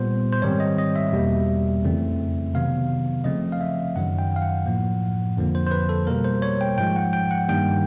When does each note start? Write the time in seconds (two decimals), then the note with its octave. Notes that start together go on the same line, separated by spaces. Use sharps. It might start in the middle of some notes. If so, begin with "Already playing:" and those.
Already playing: A#2 G3 B3 C5
0.32 C5
0.42 G#2 D#3 G3 C4 C#5
0.60 D#5
0.78 D#5
0.96 E5
1.12 E2 B2 G3 A#3
1.83 F2 C#3 E3 A3 C4
2.54 C3 D#3 F#3 B3 F5
3.24 C#3 F3 A3 C4 D#5
3.52 F5
3.61 E5
3.96 F#2 D#3 F#3 F#5
4.19 G5
4.36 F5
4.42 F#5
4.66 A2 F3 A#3
5.37 F2 D3 F3 A#3
5.55 C5
5.67 C5
5.71 B4
5.89 A4
6.07 B2 G3 A#3 A#4
6.24 C5
6.42 C#5
6.61 G5
6.78 G#2 F3 G#3 G5
6.96 F#5
7.13 G5
7.31 F#5
7.49 G2 D#3 G3 A#3 G5